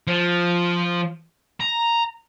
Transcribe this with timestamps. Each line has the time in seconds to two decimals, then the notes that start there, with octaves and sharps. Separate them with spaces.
0.07 F3
1.60 A#5